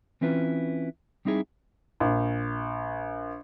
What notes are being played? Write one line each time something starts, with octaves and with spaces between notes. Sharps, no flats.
E3 C4 C#4 E4 F4 B4
G3 C4 D#4 E4 G#4
A#1